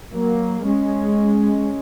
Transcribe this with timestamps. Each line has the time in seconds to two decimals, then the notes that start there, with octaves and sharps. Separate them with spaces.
0.13 F#3 A#3
0.66 G#3 C#4